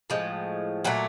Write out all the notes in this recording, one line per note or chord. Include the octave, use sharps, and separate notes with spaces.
A2 F3 G#3
A#2 F#3 A3